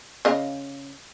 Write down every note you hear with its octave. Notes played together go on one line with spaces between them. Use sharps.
C#3 D#5 F5